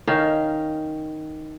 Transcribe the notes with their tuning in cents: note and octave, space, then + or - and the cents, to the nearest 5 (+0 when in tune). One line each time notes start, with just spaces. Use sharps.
D#3 +0 C#4 +0 F5 +0